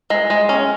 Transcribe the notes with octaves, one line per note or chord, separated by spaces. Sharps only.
G#3
G#3
C#4